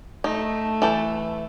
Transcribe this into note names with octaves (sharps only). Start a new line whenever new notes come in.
A3 D#4
E3 A4 G5